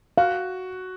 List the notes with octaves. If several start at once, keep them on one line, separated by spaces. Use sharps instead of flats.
F#4 F5